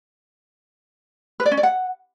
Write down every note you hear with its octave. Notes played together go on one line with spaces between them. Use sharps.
B4
D5
C#4
D5
F#5